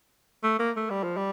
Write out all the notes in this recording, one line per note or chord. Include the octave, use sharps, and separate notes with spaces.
A3
A#3
A3
G3
F3
G3